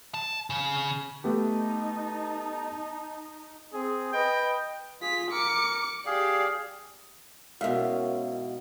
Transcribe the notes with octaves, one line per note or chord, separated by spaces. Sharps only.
A5
C#3
A3 B3 D#4 G4 A5
C4 G#4
B4 D#5 G5
F4 G#4 B6
A#4 D6 C#7
G4 G#4 D5 F5
G#2 B2 C#4 E4 A#4 E5 F5